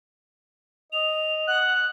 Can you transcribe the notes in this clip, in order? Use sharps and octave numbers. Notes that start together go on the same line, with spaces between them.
D#5 F7
F#5 F#6